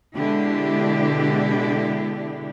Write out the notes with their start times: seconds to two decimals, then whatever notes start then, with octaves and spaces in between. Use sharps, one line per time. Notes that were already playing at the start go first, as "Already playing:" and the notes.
0.15 B2 D3 G#3 D4 E4 G4